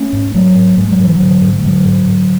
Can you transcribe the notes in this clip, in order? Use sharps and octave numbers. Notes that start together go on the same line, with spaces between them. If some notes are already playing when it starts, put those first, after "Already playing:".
Already playing: A3 C#4
G#2
G#2 F#3 A3
G#2
G#2 G#3
F#3
G#2 E3
D3 F#3
G#2
G#2
G#3
G#2 D3 F#3
G#2
G#2